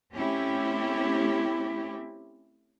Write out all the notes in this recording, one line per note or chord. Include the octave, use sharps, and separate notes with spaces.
A3 C4 C#4 E4 G4